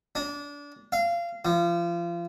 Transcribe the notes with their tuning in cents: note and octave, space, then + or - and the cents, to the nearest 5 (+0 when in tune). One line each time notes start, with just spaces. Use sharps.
D4 -25
F5 -25
F3 -30